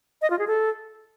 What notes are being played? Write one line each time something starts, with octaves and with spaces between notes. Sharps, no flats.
D#5
F4
G#4
A4